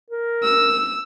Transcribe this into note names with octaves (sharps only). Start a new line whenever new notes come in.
A#4
E6